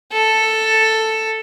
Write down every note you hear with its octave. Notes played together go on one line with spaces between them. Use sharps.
A4